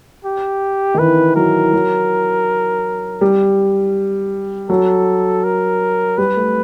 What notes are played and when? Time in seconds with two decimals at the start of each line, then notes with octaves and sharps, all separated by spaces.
0.25 G4
0.94 D#3
0.98 E3 B4
1.36 F#3 A#4
1.73 F#3
3.21 G3
4.69 F#3 A4
5.44 A#4
6.18 G3 B4
6.36 A3